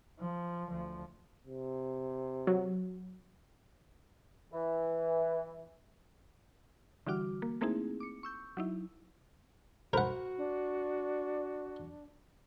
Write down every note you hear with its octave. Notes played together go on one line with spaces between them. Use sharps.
F3
D2 F3
C3
F#3
E3
D3 E3 G3 F#4 D6 F6
A#3
A3 A#3 C4 D#4 E4 G#4
D6 C#7
C#6 E6 G6
F#3 D#4 E4
F#4 A#4 C5 F#5 B5
D4